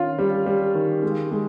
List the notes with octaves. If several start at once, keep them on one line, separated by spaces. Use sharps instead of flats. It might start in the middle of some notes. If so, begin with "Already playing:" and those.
Already playing: D#3 C#4 F4
G3
G3
D#3
G#3
G#3